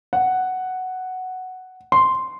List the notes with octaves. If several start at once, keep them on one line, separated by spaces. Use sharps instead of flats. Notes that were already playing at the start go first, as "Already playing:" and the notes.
F#5
C6